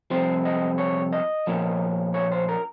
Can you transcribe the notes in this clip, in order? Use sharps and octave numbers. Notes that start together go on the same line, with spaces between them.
C2 C3 F3 C4 C5
D#5
C#5
D#5
A#2 F3 A#3 C#4
C#5
C5
A#4